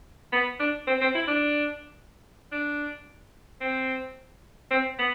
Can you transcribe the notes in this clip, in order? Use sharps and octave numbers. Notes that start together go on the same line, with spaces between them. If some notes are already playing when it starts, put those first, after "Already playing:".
B3
D4
C4
C4
E4
D4
D4
C4
C4
B3